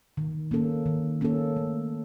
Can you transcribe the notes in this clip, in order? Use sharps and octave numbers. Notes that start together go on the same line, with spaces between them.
D#3
A#3 C#4 A4
D#3
A#3 C#4 A4
A3